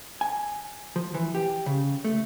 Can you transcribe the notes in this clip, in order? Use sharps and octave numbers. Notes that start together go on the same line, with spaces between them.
G#5
F3
E3
G4
C#3
A3